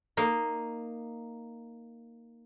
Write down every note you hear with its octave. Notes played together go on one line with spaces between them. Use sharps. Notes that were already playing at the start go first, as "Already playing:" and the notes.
A#3 D#4